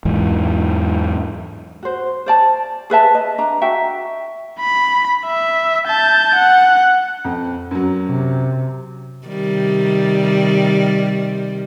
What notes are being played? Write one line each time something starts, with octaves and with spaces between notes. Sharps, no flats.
E2 G#2 E3
F#4 C5
C5 D5 A5
G#4 B4 E5 A5
D#5
D4 A#5
F#4 E5 G5
B5
E5
A5 G6
F#5
F2
F#2 F#3
C3
C3 D#3 G3